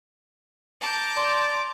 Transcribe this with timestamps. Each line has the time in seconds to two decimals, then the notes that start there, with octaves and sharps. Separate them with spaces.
0.81 A5 A#5 D6 G6
1.17 D5 C6